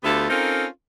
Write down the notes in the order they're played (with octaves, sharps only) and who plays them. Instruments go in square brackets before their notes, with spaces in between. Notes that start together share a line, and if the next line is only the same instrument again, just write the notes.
[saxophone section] D2 A3 B3 F4 G4 A4
C4 C#4 D#4 F4 A4 A#4